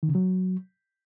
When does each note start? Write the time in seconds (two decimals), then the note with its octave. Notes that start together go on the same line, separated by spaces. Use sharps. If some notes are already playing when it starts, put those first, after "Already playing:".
0.03 D#3
0.09 C#3
0.15 F#3